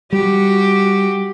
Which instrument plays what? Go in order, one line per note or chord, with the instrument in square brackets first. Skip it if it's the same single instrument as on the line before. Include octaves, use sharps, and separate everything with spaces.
[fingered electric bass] G3 [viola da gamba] F#4 G4